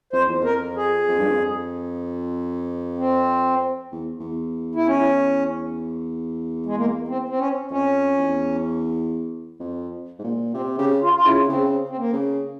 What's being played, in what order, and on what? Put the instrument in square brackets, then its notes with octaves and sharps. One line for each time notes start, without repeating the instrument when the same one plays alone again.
[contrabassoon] F2 [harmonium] C5
[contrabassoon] E2
[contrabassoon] F2 [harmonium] A#4
[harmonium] G#4
[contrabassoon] F2
G2
F2
[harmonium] C4
[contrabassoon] E2
E2
[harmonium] E4
C#4
G#3
A#3
C4
C4
C#4
[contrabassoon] F2 [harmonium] C#4
[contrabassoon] E2
F2
G#2
A#2
[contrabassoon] C3 [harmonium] C4
[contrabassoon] C#3 [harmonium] G4
[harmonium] F4
F4
[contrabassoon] C#3 [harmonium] E4
[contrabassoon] C#3 [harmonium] C4
[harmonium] C4
A#3
[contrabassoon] C#3